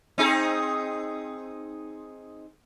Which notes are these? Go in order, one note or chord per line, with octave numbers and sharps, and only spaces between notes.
C4 D#4 G#4